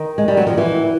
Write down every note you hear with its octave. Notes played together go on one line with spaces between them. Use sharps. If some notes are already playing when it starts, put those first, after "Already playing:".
Already playing: D#3
G#3
G3
F#3
F3
E3